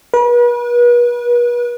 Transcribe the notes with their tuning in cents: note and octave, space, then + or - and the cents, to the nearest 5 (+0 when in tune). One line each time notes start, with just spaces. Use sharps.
B4 -40